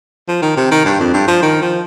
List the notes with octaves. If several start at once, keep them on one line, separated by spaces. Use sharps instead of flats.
F3
D#3
C3
D#3
G2
F2
G2
F3
D#3
F3